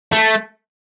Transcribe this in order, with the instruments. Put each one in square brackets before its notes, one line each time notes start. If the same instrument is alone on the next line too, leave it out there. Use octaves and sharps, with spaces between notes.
[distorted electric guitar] A3